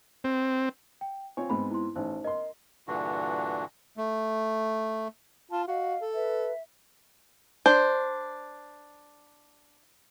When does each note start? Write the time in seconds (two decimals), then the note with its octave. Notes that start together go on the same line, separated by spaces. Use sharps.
0.24 C4
1.01 G5
1.37 C4 F4 C#5 G#5
1.50 G#2 B3 C4 B5
1.71 E4 C6
1.96 A1 D#4 C5
2.24 A#4 D#5 C6
2.88 G2 A#2 D3 E3 D4 F#4
3.97 A3
5.51 F4 A5
5.68 F#4 D#5 F5
6.01 A4
6.14 B4 E5
7.66 D4 C5